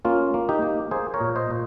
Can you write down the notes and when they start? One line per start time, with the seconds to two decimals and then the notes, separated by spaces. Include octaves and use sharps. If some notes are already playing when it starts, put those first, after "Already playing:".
0.05 A#3 C#4 F4
0.34 A#3
0.49 D#4 G4
0.62 A#3
0.91 A#3 G#4 C5
1.14 A#4 C#5
1.20 A#2
1.36 C5 D#5
1.51 A#2